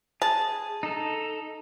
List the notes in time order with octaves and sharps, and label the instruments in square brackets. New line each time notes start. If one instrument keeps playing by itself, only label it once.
[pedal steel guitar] G#4 [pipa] A5
[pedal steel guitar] D#4 A4